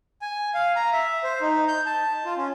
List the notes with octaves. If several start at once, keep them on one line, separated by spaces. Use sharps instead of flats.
G#5
F5
A#5
E5
C5
D#4
G6
A5
F4
C#4